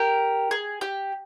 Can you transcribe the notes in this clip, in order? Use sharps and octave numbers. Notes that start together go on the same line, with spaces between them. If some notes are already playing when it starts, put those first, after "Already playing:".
Already playing: G4 A#4
G#4
G4